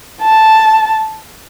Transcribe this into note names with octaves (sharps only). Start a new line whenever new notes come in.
A5